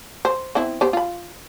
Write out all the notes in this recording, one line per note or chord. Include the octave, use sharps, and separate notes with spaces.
C5
B3 C4 E4
B3 G4 C5
F4 B5